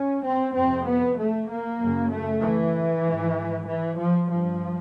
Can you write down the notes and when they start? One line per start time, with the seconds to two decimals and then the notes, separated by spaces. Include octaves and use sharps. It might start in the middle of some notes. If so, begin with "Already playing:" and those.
Already playing: C#4
0.23 C4
0.54 F2 C3 C4
0.86 B3
1.17 A3
1.49 A#3
1.80 F#2 C#3
2.11 A3
2.42 E3
3.04 G#2
3.67 E3
3.98 F3
4.29 G2 F3